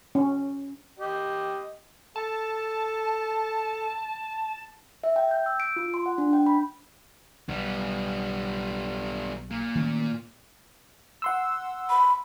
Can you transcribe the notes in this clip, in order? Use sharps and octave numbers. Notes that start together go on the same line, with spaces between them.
C#4
G4 D#5
A4 A5
E5
G5
G6
E6
D7
F4
C6
F#5
D4
G5
B5
B1 G3 B3
A#2
D#3 A3 C#4
F#5 C6 E6
B5